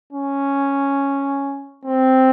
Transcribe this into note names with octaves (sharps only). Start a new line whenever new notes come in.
C#4
C4